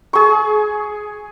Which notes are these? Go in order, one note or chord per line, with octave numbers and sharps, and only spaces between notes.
G#4 C#6